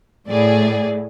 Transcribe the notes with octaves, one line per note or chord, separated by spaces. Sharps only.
A2 G#4 D5